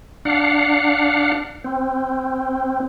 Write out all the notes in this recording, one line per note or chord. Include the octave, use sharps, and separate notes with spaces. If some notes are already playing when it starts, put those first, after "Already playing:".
D4 F5 F#5
C4